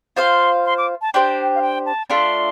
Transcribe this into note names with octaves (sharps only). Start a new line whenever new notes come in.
F4 C5 F5 C6
C6
D6
A5
D4 G4 C5 G5
F5
G5
A5
A3 D4 F4 D5 C6